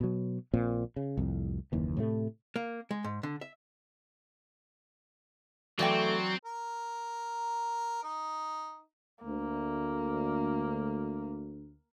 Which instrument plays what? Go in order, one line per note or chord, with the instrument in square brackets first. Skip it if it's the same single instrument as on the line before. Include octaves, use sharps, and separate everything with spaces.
[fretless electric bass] B2 F#3
A#1 A#2 C4
C#3
C2 F2 A2
F#1 D#2 E3
A2 C3 F#3 A3
[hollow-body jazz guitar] A#3
G#3
G#2
D3
E5
[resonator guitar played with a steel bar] E3 D5 G5 [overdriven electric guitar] F#3 [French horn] A3 [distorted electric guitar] C4
[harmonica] A#4
D#4
[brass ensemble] D2 [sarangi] A#3